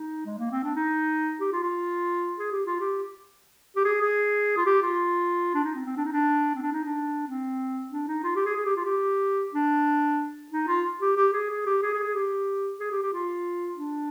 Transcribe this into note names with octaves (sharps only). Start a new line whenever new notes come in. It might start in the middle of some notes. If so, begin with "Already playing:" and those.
Already playing: D#4
G#3
A#3
C4
D4
D#4
G4
F4
F4
G#4
G4
F4
G4
G4
G#4
G#4
F4
G4
F4
D4
D#4
C4
C4
D4
D#4
D4
C4
D4
D#4
D4
C4
D4
D#4
F4
G4
G#4
G#4
G4
F4
G4
D4
D#4
F4
G4
G4
G#4
G#4
G4
G#4
G#4
G#4
G4
G#4
G4
G4
F4
D4